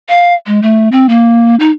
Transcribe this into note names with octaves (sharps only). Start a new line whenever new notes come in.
F5
G#3
A3
C4
A#3
D#4